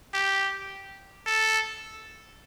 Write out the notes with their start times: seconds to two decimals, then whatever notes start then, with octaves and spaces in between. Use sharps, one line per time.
0.14 G4
1.27 A4